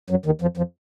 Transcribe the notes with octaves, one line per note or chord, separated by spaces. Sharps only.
F#2 F#3
D#2 D#3
F2 F3
F2 F3